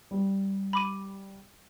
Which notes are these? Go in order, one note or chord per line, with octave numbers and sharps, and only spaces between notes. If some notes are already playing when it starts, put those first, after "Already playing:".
G3
B5 D6 D#7